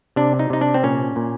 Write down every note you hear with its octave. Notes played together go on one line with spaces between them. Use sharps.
C3 D4
D#4
C3 D#4
D4
C4
A#2 C#4
A#2